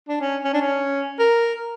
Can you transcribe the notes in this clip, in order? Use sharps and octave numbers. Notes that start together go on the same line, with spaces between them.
D4
C#4
C#4
D4
C#4
A#4